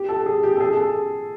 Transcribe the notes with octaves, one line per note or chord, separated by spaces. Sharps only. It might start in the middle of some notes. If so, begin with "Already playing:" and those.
Already playing: G4
A4
G#4
G4
A4
G#4
A4